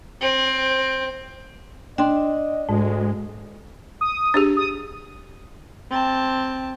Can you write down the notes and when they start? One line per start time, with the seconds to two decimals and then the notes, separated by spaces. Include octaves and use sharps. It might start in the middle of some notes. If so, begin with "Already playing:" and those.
0.21 C4
1.98 D4 D#5 G5 C6
2.69 D2 G#2 G#3
4.01 D#6
4.34 D4 G4 G#4
4.57 D#6
5.90 C4 A5